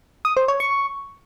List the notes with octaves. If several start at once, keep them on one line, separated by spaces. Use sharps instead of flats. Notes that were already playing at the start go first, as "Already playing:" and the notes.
D#6
C5
C#5
C#6